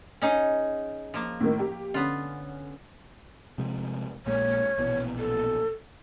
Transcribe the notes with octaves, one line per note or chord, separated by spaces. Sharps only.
C#4 D#4 G#4
F3 A#3
A2 D#3
G4
D3 B3 C#4 F4
C3 F3 G#3
A#1 A#2 G#3 C#5
A#1 B2 E3
A4